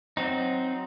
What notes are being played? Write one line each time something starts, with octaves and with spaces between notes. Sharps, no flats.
F#3 C4 D#4